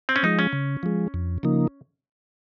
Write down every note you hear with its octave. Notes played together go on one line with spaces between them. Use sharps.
C4
C#4
F3 G#3 D#4
C#4
C#3
F3 G#3
F2
C#3 F3 A#3 D#4